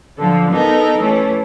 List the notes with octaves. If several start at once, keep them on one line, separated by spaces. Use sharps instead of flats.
D3 F3 A4
B3 D#4 A4 A#4
E3 A3 C#4